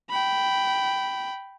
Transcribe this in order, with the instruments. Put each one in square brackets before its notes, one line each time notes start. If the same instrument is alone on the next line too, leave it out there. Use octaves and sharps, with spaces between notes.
[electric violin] G5 B5